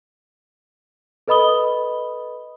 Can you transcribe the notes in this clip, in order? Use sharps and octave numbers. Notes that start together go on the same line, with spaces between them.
A4 B4 D#5 B5 D#6 G7